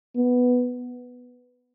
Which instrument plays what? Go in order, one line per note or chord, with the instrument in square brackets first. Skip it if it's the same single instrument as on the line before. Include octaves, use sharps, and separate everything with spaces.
[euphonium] B3